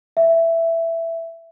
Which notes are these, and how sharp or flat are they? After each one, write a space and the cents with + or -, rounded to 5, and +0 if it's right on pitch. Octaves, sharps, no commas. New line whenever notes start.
E5 +10